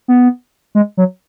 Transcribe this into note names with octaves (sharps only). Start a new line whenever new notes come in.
B3
G#3
F#3